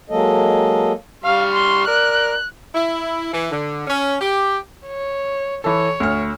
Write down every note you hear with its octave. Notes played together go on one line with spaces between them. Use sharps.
F#3 G#3 A#3 A4 D#5
G3 F5 C#6 F6
C6
A#4 D5 F#6
E4
E3
D3
C#4
G4
C#5
E3 A4 C#5
D2 F6